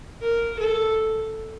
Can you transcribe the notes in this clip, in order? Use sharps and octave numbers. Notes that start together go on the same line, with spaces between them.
A#4
A4